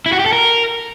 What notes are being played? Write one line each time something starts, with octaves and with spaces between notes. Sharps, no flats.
E4
F#4
G4
A4
A#4